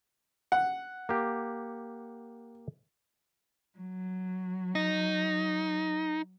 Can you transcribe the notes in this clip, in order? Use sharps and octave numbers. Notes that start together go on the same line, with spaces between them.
F#5
A#3 G4
F#3
D#4